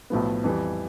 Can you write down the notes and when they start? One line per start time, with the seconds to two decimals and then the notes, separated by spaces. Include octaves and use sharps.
0.10 B1 A2 F3 B3
0.44 F2 E3 G3